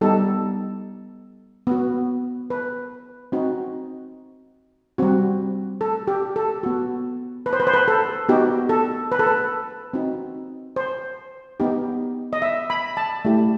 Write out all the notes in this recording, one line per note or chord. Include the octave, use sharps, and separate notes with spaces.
G3 B3 D#4 G4 A4
B3 F#4
B4
C4 D#4 F#4
G3 C4 F#4
A4
G4
A4
B3 F#4
B4
C5
B4
C5
B4
A4
B3 D#4 F#4 G4
A4
B4
A4
B4
C4 D#4 F#4
C5
B3 D#4 G4
D#5
E5
B5
A5
A3 E4 G4